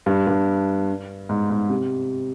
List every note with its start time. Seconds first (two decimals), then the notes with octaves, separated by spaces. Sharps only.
0.06 G2
0.27 G2
1.29 G#2
1.50 G#2
1.69 C3